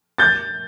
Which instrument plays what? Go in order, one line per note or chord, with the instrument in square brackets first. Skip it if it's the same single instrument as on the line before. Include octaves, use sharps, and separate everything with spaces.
[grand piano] G6 A6